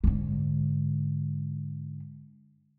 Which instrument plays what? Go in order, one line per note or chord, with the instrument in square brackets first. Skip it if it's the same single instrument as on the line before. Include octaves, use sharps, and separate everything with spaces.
[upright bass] G#2 D3